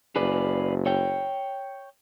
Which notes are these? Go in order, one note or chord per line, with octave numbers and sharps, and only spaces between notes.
F#1 G#4 B4 D5
C#5 G5